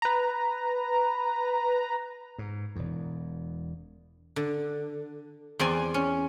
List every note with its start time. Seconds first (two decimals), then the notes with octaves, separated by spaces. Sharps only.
0.02 B4 A#5
2.39 G#2
2.76 E1 E2
4.36 D3
5.59 E2 C4 D5 G#5
5.94 C#4